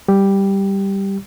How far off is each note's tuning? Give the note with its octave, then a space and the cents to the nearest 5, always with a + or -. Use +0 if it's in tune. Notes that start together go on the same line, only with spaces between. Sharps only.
G3 +0 G4 +0